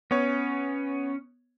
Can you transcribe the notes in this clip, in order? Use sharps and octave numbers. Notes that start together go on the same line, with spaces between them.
B3 C#4 C#5